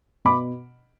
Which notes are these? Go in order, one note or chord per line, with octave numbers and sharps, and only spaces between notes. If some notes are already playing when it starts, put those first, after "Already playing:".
B2 B5 D6